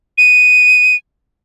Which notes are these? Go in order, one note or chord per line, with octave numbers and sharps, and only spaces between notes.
D#7